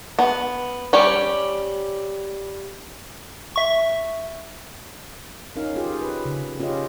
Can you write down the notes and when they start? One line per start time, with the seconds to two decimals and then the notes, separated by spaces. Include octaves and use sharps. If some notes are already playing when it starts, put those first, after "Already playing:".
0.19 B3
0.93 G3 C#4 G4 C#5
3.56 E5 C#6
5.56 C#4 D#4 A#4 F5
5.76 F4 G4 G#4
6.01 B4
6.25 C#3
6.59 C#4 F4 G4 G#4 D#5